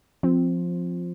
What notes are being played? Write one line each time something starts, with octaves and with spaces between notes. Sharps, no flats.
F3 C4